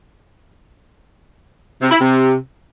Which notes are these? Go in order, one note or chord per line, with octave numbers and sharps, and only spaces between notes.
C3
E4
C3